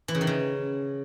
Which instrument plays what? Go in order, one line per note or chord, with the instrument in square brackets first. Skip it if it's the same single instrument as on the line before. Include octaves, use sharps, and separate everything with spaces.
[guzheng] E3
C#3
D#3
C#3